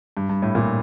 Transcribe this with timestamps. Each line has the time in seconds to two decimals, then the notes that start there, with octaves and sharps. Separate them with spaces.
0.17 G2
0.29 G2
0.42 A2
0.55 A#2